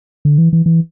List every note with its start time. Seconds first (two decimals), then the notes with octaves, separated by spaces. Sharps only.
0.25 D3
0.38 E3
0.53 E3
0.66 E3